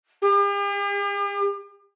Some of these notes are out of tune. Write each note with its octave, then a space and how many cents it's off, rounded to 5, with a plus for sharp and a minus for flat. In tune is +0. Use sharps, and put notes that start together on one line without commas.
G4 +45